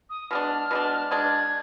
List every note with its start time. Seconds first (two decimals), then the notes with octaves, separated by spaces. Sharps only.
0.10 D#6
0.31 B2 G#3 D4 F6
0.71 B2 G#3 D4
1.11 B2 G#3 D4 G#6